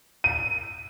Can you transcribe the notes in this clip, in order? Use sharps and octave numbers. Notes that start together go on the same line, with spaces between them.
D#7